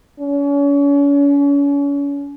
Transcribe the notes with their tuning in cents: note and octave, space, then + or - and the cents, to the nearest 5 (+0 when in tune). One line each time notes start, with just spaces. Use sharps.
C#4 +35